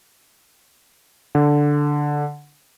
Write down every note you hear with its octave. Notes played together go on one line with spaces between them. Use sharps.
D3